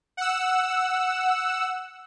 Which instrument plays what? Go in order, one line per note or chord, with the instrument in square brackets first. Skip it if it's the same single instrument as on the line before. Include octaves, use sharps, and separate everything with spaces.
[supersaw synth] F#5 E6